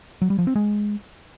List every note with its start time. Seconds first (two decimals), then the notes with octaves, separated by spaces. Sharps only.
0.22 F#3
0.30 G3
0.39 F3
0.47 C4
0.55 G#3